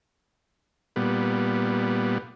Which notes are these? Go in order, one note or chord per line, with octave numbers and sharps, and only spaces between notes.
A#2 G3 B3